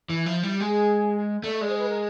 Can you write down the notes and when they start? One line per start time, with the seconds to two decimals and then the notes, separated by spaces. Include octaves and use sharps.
0.09 E3 E4
0.26 F3
0.43 G3 E4
0.54 G4
0.60 G#3
0.66 G#4
1.44 A3 D5
1.52 D#5
1.60 G#3 D5
1.69 C5
1.78 B4
1.89 A#4